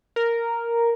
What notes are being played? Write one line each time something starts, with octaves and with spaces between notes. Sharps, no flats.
A#4